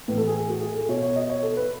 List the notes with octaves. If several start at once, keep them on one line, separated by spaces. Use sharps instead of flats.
A2 E3 B4
A4
G#4
G#4
F#4
G#4
A4
B2 C#5
C#5
D#5
C#5
A4
B4